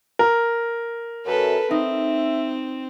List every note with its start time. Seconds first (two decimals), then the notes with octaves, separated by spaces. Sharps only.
0.19 A#4
1.26 F#2 A4 B4
1.71 C4 D#4 E5